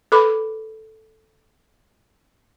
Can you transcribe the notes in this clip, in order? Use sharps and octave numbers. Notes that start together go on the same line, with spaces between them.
A4 B4 B5 D6